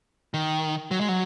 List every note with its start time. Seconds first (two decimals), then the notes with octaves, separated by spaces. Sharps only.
0.34 D#3
0.91 F#3
1.01 G#3
1.09 F#3